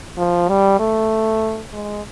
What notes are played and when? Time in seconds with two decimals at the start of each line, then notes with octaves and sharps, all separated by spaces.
0.17 F3
0.48 G3
0.79 A3
1.73 G#3